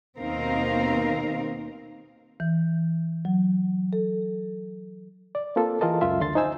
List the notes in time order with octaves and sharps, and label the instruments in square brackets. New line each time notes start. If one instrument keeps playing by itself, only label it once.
[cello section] D#2 B2 C4 D#4 A#4 F5
[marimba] E3
F#3
A4
[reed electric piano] D5
A#3 C4 F4 A4
E3 F4 G#4 A#4 D#5 A5
C#2 F#2 F4 E5
D2 D3 C6 A6
D#4 C5 G#5 E6